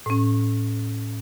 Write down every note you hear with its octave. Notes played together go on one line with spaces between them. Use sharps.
A2 C#4